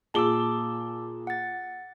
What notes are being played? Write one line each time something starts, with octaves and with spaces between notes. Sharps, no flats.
A#2 G#4 A5 D6 E6 G7
F#5 A6